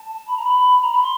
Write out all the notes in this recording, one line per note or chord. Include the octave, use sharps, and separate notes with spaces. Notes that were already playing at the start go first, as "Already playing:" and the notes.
Already playing: A5
B5
A#5
B5
A#5
B5
C6